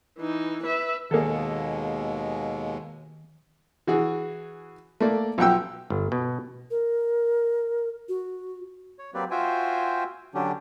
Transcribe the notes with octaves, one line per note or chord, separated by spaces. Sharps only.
E3 D#4
B4 E5
D#2 B2 D#3 G#3 A#3 G#4 A4
E3 F#4 G#4
A3 A#3 D5
B1 F3 F#5 G5 E6
G1
B2
A#4
F#4
C#5
F#3 A#3 C4 G4 B4 D5
F4 F#4 C5 E5 G5 G#5
D3 F#3 C#4 D4 G4